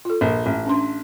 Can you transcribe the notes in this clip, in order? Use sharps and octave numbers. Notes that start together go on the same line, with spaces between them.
F4 A4
A#1
A1
C#4 D4 C6